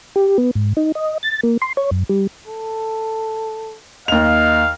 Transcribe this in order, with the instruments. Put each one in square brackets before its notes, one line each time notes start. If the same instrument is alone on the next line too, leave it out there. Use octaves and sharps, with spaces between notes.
[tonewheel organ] G4
B3
G#2
D#4
D#5
A6
A#3
C6
C#5
F#2
G3
[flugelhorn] A4
[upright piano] D#2 F7 [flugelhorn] D#5 [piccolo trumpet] F5